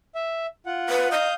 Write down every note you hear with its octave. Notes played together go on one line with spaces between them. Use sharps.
E5
F4 F#5
B4
D#5 F5 D#6 G6